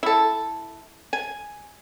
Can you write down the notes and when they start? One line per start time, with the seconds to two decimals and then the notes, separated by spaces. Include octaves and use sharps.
0.03 E4 A4
1.13 G#5